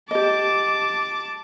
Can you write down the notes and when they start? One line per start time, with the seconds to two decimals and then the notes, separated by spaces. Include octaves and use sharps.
0.11 G4 D#5 A5 D6